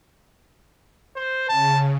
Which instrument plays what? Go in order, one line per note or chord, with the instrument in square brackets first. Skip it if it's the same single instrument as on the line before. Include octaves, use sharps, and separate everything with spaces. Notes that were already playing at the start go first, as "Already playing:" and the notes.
[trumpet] C5
[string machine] C#3 [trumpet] A5